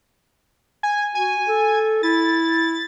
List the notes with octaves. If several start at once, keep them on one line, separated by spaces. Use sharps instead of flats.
G#5
F#4 G#5
A4
E4 A6